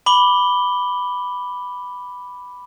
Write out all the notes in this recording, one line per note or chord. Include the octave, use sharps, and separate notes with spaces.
B5 D6 F#7 G7